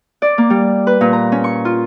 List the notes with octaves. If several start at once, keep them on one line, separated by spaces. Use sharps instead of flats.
D5
A#3
G3
B4
A#2
A#5
C#4
C#6
F4